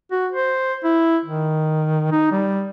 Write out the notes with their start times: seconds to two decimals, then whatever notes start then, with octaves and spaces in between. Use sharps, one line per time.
0.11 F#4
0.32 C5
0.84 E4
1.25 D#3
2.11 D#4
2.31 G3